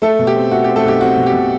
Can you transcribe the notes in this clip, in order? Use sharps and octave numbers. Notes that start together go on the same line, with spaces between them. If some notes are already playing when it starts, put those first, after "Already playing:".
A3 A4
B2
G4
C4
A3 F#4
G4
C4
A3 A4
B1 G4
C4 F#4
B2
G4
B2